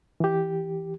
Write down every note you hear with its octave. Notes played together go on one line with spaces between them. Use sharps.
E3 G4